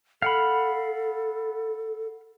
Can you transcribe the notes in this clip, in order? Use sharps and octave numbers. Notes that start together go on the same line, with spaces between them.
A4 F5 F#5 B5